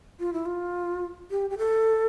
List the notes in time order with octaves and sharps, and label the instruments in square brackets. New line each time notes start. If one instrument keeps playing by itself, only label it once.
[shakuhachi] F4
E4
F4
G4
G4
A4